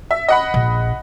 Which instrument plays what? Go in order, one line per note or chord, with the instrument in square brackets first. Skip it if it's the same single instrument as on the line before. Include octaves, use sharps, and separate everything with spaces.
[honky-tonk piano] E5
D#5 F#5 B5
[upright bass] A#1